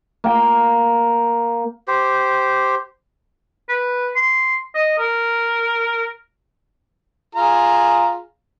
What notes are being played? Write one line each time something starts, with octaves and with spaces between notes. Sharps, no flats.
A#3 G5
G4 C5
B4
C6
D#5
A#4
F4 G#4 A#5